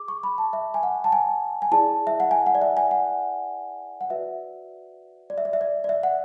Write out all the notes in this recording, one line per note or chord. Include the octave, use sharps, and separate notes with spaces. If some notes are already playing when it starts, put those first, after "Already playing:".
Already playing: G#4 D6
C#6
B5
A5
E5
G#5
F#5
A5
G#5
G#5
E4 G#4 D5 A5
E5
F#5
G#5
F#5
D5
E5
G#5
F#5
F#5
F#4 B4 D5 E5
D5
E5
D5
E5
D5
D5
E5
F#5